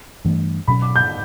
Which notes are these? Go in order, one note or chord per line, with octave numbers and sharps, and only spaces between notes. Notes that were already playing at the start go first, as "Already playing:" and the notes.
G2 E3 A3
B2 F#3 C#4 B5
D6
G6